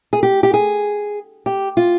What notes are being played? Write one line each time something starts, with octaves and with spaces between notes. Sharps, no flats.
G#4
G4
G4
G#4
G4
F4